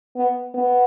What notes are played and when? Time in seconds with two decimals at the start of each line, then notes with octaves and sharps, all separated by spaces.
0.16 B3
0.54 B3